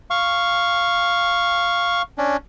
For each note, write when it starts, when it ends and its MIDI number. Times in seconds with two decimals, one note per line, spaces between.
0.10 2.02 77
0.10 2.02 85
2.18 2.37 61
2.18 2.37 62